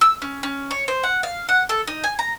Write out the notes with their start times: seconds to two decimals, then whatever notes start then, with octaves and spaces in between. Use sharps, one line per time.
0.01 E6
0.22 C#4
0.43 C#4
0.71 C#5
0.88 C5
1.03 F#5
1.23 F5
1.49 F#5
1.69 A4
1.87 D#4
2.04 G#5
2.19 A#5